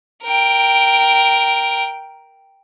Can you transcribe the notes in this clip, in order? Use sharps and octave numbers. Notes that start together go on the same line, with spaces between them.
A#4 G5